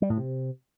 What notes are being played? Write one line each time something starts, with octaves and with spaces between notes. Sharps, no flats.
G3
A2
C3